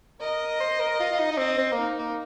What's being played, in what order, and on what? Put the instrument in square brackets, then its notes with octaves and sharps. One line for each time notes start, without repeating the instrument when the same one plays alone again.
[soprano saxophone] A#4 [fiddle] D#5
[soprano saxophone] C5
A#4
F4
F4
D#4
D#4
[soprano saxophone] C4 [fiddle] D#5
[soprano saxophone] C4
A#3
[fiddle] D#4
[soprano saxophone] A#3